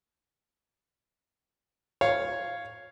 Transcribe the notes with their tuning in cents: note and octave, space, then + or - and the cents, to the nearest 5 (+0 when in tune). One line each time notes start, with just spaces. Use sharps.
C#5 +0 F5 +0